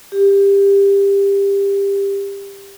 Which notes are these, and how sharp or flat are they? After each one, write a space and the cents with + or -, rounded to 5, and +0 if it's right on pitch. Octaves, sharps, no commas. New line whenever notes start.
G4 +20